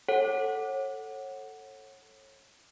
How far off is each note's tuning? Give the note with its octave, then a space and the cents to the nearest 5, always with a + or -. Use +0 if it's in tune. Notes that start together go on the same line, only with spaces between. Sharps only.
A4 +0 C#5 -30 F#5 +0